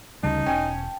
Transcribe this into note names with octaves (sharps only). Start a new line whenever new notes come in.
D2 C#3 G3 D#4 A5
E1 C#4 G5 G#5